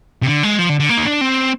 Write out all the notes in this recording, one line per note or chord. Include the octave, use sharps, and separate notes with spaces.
C3
D3
G#3
F3
D3
D3
A#3
D#4
D4
C4